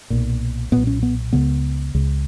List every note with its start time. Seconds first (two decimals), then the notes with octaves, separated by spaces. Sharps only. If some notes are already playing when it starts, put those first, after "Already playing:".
0.10 B1 A#2
0.72 B1 A#2 B3
0.87 C#4
1.03 B3
1.33 C#2 C#3 B3
1.95 C#2 C#3